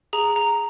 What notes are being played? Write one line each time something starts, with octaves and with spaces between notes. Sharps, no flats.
G#4 A#5
A#5